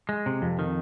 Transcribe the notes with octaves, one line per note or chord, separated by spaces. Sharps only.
G#3
C3
F2
D#3